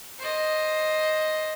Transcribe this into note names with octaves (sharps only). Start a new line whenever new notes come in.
C5 D#5